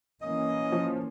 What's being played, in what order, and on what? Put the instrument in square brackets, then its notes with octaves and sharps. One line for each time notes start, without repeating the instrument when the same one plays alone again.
[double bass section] E3 A#3 C#4 [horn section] D#5
[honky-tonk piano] F3